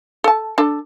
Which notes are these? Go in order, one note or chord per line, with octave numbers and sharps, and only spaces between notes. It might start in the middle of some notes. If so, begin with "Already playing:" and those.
A4 A5
D4 A4